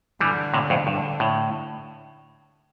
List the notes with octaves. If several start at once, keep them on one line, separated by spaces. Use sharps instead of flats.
D3 E3 G3
A2 C3
F2 A2
G2 D3
A2